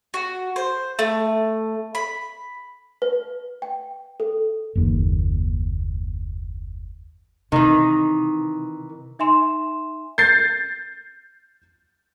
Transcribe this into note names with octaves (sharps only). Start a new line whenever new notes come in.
F#4
C5
A3
B5
B4
G5
A4
F#1 D#2
C3 D#3 E3
D#4 E5 G#5 C6 E7
G6 A6 C7